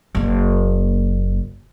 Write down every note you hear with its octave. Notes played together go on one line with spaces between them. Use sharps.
F#1 A#3